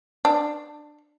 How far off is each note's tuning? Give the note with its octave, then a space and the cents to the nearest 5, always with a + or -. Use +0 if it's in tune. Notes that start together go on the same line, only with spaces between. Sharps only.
D4 +20